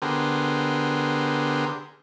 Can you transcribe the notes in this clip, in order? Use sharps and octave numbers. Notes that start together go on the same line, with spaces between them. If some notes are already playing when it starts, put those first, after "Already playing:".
D3 B3 G4 G#4 A#4 C5